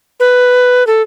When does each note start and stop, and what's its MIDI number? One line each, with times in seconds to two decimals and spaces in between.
0.20 0.86 71
0.87 1.02 69